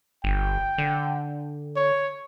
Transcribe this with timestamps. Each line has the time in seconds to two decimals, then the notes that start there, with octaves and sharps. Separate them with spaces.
0.24 G1 G5
0.78 D3
1.77 C#5